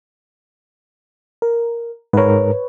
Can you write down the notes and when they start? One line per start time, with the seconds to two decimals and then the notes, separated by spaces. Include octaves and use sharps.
1.42 A#4
2.13 G#2 A#4 B4 C#5